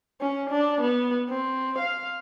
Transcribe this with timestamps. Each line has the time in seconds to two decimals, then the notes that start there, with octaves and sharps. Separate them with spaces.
0.21 C#4
0.50 D4
0.81 B3
1.30 C4
1.79 F5